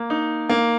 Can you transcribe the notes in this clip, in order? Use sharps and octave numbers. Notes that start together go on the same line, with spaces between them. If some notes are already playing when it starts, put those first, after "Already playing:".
Already playing: A#3
D#4
A#3